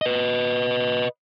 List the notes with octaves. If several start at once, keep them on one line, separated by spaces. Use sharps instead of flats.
B4 D#5